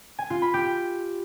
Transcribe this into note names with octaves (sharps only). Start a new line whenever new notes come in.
G#5
F4
B5
G4